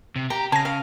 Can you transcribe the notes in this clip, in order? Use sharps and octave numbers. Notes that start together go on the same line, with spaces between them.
C3
G4 A#5
C#3 G#5 A5 A#6
F5